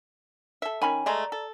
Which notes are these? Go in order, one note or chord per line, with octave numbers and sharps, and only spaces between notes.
A4 E5
D#3 C#4 G#5 B5
G#3 A3 D5 D#5 A#5
A4